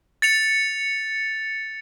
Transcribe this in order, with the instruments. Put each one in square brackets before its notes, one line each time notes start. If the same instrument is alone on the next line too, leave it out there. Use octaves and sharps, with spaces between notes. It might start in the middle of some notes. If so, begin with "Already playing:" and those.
[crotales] A6 C#7 F7